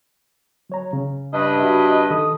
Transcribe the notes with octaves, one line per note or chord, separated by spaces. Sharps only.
F#3 C#5 A#5
C#3
G2 B4 D#5
F#4 E5
D#3 A4 D#6